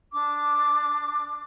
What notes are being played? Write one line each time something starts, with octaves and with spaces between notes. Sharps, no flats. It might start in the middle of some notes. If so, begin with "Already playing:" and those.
D4 D6